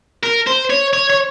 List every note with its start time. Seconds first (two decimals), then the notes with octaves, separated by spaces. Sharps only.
0.23 A#4
0.47 C5
0.70 C#5
0.93 C#5
1.10 C#5